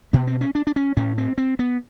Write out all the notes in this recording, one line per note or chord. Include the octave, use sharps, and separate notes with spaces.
B2 B3
C4
C#4
D4
D4
C#4
A2 C#4
C4
C4
B3